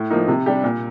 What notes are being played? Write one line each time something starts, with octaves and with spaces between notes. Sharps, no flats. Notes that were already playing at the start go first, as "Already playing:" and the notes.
Already playing: A2
F3 A#3 D#4
C3
G3 D4 G4
A#2